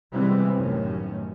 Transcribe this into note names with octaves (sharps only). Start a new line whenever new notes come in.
C3 E3 G3 G#3 B3 C4
A1 F#2 A2 C3 D#3 C#4